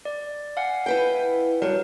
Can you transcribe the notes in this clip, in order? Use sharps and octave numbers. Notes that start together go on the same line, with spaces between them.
D5
F5 F#5 G#5
E4 B4 G5
G2 F#3 G3 A#4